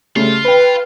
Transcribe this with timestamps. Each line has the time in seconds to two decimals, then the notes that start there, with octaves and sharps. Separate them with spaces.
0.16 C#3 G3 A3 F4
0.44 B4 G5 B5